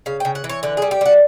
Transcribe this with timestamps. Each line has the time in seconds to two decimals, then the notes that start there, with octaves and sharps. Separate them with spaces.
0.06 C#3 F5
0.20 C#3 G5
0.35 F#5
0.44 E3
0.49 C#5
0.63 D3 B4
0.77 G3 G#4
0.91 G4
1.01 G3 F#4